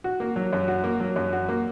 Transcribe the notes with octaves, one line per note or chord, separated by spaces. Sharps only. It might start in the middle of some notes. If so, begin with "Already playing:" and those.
F#4
A#3
F#3
F#2
F#4
A#3
F#3
F#2
F#4
A#3